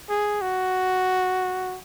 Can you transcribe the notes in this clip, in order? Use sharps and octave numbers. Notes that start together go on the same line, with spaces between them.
G#4
F#4